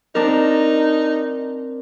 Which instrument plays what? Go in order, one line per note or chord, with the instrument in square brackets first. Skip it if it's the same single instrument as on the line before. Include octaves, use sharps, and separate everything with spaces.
[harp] C4 D4 A#4 [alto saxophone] D#4